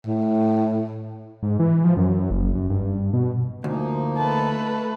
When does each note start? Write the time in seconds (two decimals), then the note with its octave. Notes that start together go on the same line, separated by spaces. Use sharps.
0.06 A2
1.43 G#2
1.59 E3
1.84 F3
1.97 F#2
2.31 F#1
2.55 F#2
2.70 G2
3.13 B2
3.64 D2 F3 A#3 D#4
4.18 A3 B4 A5